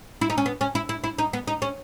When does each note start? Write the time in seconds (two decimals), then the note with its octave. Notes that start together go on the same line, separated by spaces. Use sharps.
0.21 E4
0.30 D#4
0.38 C#4
0.46 B3
0.61 C#4
0.75 E4
0.89 E4
1.04 E4
1.18 D#4
1.33 B3
1.47 D#4
1.62 C#4